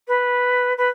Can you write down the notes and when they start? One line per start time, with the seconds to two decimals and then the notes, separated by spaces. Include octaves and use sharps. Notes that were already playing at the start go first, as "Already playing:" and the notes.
0.07 B4
0.77 B4